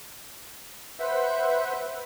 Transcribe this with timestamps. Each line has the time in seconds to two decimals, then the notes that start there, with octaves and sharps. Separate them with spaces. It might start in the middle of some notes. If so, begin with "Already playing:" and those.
1.00 B4 C5 E5 F#5